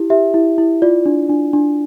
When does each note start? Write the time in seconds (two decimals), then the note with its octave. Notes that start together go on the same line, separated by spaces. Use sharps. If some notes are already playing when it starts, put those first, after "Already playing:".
Already playing: E4 G4
0.10 G4 E5
0.34 E4
0.58 E4
0.82 F4 D5
1.06 D4
1.29 D4
1.53 D4